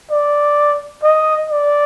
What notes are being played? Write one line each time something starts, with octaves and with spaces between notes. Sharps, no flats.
D5
D#5
D5